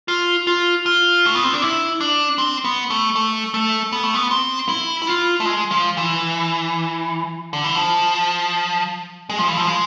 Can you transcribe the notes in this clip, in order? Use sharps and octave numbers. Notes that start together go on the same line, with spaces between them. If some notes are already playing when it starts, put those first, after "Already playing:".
F4
F4
F4
A3
B3
C4
D4
E4
D4
C4
B3
A3
A3
A3
B3
A3
B3
C4
E4
E4
F4
A3
G#3
F3
E3
D3
E3
F3
G#3
F3
E3
F3
G#3